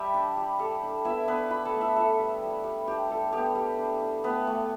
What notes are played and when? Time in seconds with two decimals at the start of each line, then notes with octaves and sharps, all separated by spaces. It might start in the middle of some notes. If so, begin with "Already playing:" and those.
Already playing: G3 E4 G4 E5 G5 A5
0.14 D4
0.37 G3
0.59 G3 A4
0.83 D4
1.05 B3 E4 E5
1.28 B3 D4 B4
1.50 E4 B4 B5
1.65 A4 A5
1.73 A3
1.81 E4 E5
1.96 E4 A4
2.19 G3
2.42 G3
2.64 G3
2.87 D4 G4
3.10 G3 A4
3.33 B3 G4
3.55 G3
3.78 D4
4.02 D4
4.24 A3 B3 B4
4.47 A3